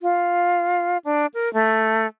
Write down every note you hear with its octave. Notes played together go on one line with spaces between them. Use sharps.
F4
D4
A#4
A3